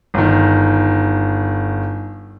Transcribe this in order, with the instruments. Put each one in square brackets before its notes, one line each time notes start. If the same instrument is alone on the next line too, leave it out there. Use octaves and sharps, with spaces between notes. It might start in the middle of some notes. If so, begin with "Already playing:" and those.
[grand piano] G1 D#3